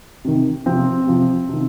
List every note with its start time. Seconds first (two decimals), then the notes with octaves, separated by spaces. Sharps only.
0.25 C3 D#3
0.66 C3 F3 C4
1.07 C3 F3
1.49 C3 D#3